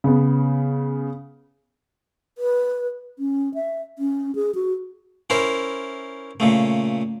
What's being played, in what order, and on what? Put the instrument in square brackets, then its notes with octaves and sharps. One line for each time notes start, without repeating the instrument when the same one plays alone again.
[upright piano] C#3 B3
[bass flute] B4
C#4
E5
C#4
G#4
F#4
[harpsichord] C#4 E4 A#4 C5
A#2 C#3 A3